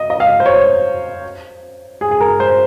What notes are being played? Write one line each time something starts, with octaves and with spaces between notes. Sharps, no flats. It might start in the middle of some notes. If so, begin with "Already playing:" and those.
Already playing: D#5
D#5
F5
C5
C#5
G#4
G#4
A#4
C5